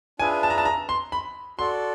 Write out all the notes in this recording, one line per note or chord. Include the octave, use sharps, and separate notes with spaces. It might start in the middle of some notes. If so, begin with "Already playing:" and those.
D4 F4 G#4 B4 E5 G#5
A5
A#5
A5
A#5
C6
B5
F#4 A4 D5 C6